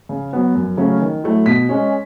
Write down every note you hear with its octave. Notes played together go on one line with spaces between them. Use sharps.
C#3
F#3 B3
F#2
C#3 F#3 A3 C#4
D#3
F#3 A3 E4
B2 B6
G#3 C#4